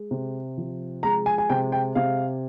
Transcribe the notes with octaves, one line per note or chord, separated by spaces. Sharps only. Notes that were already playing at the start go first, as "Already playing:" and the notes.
Already playing: G#3
C3
F3
G#3 A#5
G#5
G#5
C3 G5
G5
C3 F5